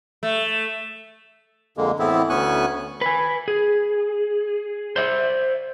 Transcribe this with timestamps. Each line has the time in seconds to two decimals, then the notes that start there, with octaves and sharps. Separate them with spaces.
0.23 A3
1.77 F2 D3 G#3 A#3
1.99 A2 E3 B3 C4 E4
2.30 D2 B3 C#4 G#5 C#6 F#6
3.01 B4 G#5
3.48 G#4
4.96 C5 D5 E5